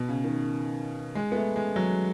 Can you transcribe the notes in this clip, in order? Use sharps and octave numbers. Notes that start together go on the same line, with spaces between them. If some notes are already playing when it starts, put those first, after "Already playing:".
Already playing: B2
C#3
D#3
G#3
B3
A3
G#3
F#3